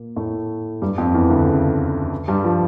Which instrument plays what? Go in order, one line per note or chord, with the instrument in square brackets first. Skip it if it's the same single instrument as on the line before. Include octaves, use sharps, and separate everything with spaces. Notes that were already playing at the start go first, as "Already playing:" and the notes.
Already playing: [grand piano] A#2 A#3
A2 A3
G2 G3
F2 F3
E2 E3
D2 D3
C#3
G2 G3
F3